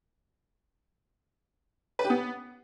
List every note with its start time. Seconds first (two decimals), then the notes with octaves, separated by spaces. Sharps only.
1.99 B4
2.04 G4
2.10 B3